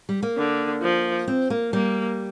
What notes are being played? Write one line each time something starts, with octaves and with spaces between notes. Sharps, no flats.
G3
A#3
D3
F3
C4
A#3
G3 A#3